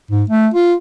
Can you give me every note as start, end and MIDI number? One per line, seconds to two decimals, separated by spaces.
0.11 0.23 44
0.30 0.48 57
0.54 0.74 65